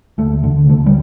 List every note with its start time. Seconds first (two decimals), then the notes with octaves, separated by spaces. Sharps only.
0.18 D2 A3
0.44 D3
0.69 D2 A3
0.86 G3